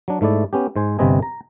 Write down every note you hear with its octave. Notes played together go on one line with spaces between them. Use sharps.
F#3 D4
G#2 A3 E4 D5
B3 C#4 G4
G#2 C5 G#5
G1 C3 C4 B4 D#5 G#5
A#5